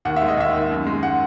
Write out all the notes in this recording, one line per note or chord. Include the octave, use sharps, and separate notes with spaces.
D#2 F#5
E5
G#3
D#5
D#2 E5
D#3
F#2
G#3
F#5